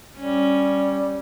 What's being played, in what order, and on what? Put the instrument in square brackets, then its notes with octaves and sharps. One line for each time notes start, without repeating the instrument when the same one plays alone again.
[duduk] G3 [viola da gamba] C#4